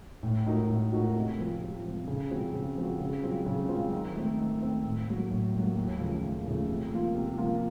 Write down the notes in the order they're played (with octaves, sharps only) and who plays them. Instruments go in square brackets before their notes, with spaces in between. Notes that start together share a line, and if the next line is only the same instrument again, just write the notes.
[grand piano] A2
A3 D#4 F#4 A#4
A2
A3 D#4 F#4 A#4
C3
F3 C4
C3
F3 C4
C#3
F3 C4 F#4
C#3
F3 C4 F#4
C#3
F#3 C4 F4
C#3
F#3 C4 F4
D#3
A3 C4
D#3
A3 C4
A2
F#3 A#3
A2
F#3 A#3
D#2
C#3 F3 A3
D#2
C#3 F3 A3
C3
F3 A#3 F4
C3
F3 A#3 F4